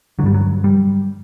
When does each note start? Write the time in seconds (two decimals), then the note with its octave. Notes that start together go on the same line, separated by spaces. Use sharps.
0.19 D3 F#3
0.23 G2 G3
0.34 F#3
0.64 G3